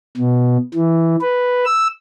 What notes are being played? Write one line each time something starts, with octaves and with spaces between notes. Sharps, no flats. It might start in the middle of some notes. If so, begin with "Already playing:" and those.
B2
E3
B4
E6